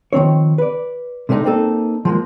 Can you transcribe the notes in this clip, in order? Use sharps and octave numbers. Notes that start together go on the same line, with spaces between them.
D#3 F3 C4 C#5
B4 D5
C3 G#3 A3 C#4 D#4
A#3 C4 D#4 A4
F3 G#3 A#3